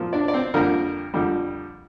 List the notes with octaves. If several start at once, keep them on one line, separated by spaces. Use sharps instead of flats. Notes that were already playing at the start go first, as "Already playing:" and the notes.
Already playing: A#2 F3
D4 D5
D5
C4 C5
F2 D3 G3 A#3 A#4
F2 D3 G3